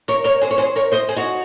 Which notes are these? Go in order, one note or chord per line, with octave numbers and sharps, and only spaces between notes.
A#4 C#5
A#4 C#5
G#4 C5
C#5
G#4 C5
A#4 C#5
C5 D#5
G#4 C5
D#4 F#4